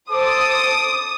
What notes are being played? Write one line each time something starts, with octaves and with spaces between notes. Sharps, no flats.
A4 C5 D6 D#6